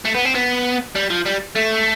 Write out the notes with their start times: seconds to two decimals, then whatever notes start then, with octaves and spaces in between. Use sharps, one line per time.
0.05 A3
0.15 B3
0.25 C4
0.35 B3
0.96 G3
1.10 F3
1.26 G3
1.56 A3